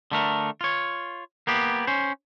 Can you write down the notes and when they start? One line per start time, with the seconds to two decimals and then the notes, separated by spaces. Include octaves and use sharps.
0.12 D3 A3 A#4
0.61 F4 C#5
1.47 A#3 B3 G4
1.87 C#4 C5